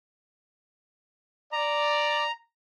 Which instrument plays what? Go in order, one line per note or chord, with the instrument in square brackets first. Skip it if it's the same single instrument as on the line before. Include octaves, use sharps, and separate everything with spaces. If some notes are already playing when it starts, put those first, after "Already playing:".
[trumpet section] D5 [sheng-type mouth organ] A#5